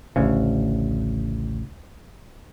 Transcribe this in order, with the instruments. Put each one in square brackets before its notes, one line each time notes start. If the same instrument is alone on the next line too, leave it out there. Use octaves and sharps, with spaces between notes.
[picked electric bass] A1 D2 C#3